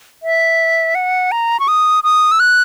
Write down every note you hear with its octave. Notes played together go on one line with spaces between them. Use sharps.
E5
F#5
A#5
C#6
D#6
D#6
E6
F#6